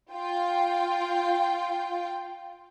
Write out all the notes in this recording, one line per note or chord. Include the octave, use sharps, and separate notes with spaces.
F4 G5